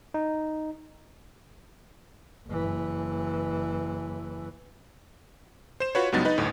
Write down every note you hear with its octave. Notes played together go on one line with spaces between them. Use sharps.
D#4
F#1 E3
C5 E7
F4 F#4 B4 C#5
C#2 G2 F#3 B3 D#4 A6
D#4 B4 D#5
G1 D2 A2